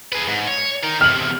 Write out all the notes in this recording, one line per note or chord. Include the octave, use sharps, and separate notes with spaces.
G#4 B4
G#2
C#5
D#4 A#4
E2 C3 F6 F#7